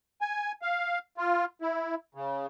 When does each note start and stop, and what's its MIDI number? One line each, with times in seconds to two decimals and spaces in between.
0.21 0.52 80
0.62 0.99 77
1.18 1.45 65
1.62 1.95 64
2.15 2.47 49